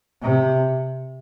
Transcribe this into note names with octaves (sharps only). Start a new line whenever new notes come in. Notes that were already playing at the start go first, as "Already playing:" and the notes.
C3